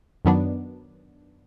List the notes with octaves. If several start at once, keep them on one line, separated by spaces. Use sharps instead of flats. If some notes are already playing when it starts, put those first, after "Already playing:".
F#2 D#3 F#3 B3 D4